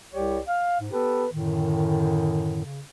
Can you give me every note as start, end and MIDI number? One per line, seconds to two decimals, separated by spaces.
0.14 0.39 36
0.14 0.39 55
0.14 0.39 67
0.14 0.39 73
0.14 0.39 74
0.48 0.78 77
0.80 0.88 44
0.92 1.26 59
0.92 1.26 67
0.92 1.26 69
0.92 1.26 71
1.31 2.63 42
1.31 2.63 45
1.31 2.63 50
1.31 2.63 51
2.65 2.80 49